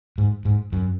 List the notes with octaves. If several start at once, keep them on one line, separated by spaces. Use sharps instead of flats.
G#2
G#2
F#2